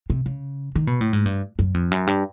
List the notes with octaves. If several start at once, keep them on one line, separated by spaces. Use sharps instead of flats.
C3
C#3
D#3
B2
A2
G#2
G2
F#2
F2
F#2
G2